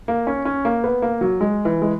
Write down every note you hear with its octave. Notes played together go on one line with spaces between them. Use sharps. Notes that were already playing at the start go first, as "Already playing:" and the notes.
A#3
C#4
C#4
A#3
B3
A#3
F#3
G#3
E3
G#3